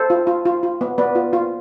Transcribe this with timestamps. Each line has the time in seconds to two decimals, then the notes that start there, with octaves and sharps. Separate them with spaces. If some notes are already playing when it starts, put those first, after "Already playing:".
Already playing: A4 C5
0.10 F4
0.27 F4
0.45 F4
0.63 F4
0.81 B3
0.98 B3 B4 D5
1.15 F4
1.33 F4